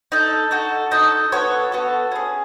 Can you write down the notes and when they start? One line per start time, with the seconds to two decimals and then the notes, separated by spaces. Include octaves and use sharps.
0.12 D#4 A4
0.51 D#4 F#4 A4
0.91 D#4 F#4 A4 D#5
1.32 B3 F#4 A4 C#5
1.72 B3 F#4 A4
2.12 C#4 G#4